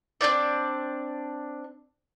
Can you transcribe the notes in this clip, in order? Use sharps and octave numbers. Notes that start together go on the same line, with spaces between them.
C4 D4 D#4 D5